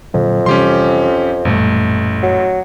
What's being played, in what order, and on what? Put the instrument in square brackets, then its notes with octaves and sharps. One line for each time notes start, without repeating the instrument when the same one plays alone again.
[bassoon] F2 [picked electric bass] A#2 D3 F#3
[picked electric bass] C3 E3 G3 [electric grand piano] C#4 G4 C6
[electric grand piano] A1 A3 [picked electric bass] F#2 A#2 G3
[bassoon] F#3